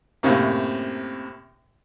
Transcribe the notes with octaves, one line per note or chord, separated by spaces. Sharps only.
F#2 A2 C3 A#3